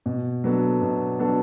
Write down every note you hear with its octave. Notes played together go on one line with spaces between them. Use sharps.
B2
F#3 B3 D4 A4
B2
F#3 B3 D4 A4